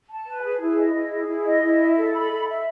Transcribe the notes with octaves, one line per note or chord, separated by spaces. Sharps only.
A5
B4
G#4
E4
D#5
E4
G#4
E4
D#5
E4
E5
A4
B5
A4
E5